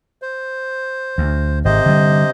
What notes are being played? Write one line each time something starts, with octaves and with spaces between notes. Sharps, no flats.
C5
D2
G#1 C3 C5 D#5
D3 G3